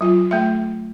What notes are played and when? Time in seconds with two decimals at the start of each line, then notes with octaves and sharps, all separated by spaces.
0.01 F#3 F4
0.31 A3 E5